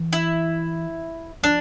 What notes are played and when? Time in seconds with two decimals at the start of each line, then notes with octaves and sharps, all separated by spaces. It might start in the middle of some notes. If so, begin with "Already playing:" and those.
Already playing: E3
0.13 E4
1.43 F3 D4